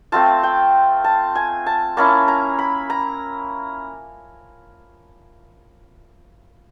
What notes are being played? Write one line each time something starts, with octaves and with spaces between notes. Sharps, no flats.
A3 C4 F4 A5
G5
A5
G#5
A5
A#3 C#4 E4 A5
A#5
B5
A#5